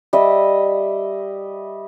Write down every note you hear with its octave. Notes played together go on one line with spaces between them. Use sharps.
G3 D#5 E5